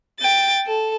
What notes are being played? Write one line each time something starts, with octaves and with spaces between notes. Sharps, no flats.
G5 A6
A4